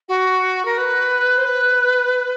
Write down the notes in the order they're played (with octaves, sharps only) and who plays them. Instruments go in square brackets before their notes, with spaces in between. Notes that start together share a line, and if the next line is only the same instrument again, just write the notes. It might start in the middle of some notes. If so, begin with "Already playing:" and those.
[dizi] F#4
A#4
B4
C5
B4